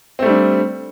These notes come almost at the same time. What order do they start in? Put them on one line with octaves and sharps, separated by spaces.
C4 A3 G3 D4